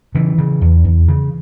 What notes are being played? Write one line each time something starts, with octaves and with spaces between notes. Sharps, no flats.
C#3 E3
C#3
E2
E2
C#3